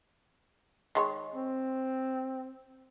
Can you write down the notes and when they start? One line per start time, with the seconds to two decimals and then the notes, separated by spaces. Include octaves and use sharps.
0.95 D#3 G#3 C#5
1.35 C4